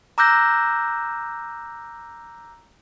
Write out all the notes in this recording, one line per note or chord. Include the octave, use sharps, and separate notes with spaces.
A#5 D6 E6 F#6 G6 A#6